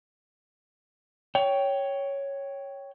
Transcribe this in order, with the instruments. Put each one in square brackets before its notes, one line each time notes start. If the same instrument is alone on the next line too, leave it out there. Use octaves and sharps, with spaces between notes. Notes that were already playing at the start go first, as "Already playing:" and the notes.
[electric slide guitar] C#5 G5